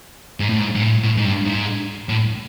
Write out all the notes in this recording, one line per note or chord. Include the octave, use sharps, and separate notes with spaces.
G#2
A2
G#2
G#2
A2
A2
G#2
G2
G#2
A2